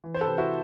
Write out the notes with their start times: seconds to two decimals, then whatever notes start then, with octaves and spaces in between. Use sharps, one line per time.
0.04 E3
0.14 C5
0.21 A4 B4
0.27 C3
0.38 E4 F#4